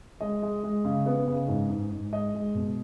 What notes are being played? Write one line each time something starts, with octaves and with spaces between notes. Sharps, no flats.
G#3 D#5
G#3
G#3
C#3
B3
C#3
G#2
G#2
G#2
G#3 D#5
G#3
B2